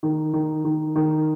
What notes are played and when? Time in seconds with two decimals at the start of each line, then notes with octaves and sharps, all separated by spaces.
0.03 D#3
0.33 D#3
0.65 D#3
0.96 D#3